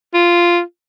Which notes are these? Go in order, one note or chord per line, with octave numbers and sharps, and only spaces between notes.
F4